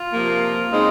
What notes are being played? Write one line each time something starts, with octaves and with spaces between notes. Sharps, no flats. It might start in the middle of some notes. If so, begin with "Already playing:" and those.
Already playing: F4
C3 F3 A#3
C#3 G#3 C4 D#4